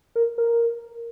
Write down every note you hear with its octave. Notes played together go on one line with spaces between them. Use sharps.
A#4
A#4